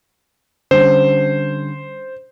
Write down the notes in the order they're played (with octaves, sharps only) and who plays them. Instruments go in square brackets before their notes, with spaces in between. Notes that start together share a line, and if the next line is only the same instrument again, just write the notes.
[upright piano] D3 G3 C#4 [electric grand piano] C5